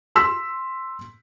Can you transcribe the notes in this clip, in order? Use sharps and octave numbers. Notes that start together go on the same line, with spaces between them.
C6 E6 B6